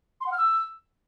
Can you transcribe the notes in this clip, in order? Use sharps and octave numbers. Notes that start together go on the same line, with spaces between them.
C6
F#5
F6
E6